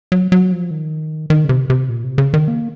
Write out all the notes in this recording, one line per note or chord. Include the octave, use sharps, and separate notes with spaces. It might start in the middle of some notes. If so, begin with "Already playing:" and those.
F#3
F#3
F3
D#3
D#3
C#3
C3
C3
A#2
C3
C#3
D#3
A#3